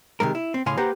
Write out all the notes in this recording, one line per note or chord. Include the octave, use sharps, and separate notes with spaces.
C3 D#3 G#3 A#4
E4
C4
A2 C#3 F5 G#5 C6
A#3 G4 B4 C5 F#5 A#5